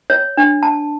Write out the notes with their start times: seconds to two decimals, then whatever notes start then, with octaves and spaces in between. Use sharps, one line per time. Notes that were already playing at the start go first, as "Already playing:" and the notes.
0.10 C#5
0.37 D4
0.63 A5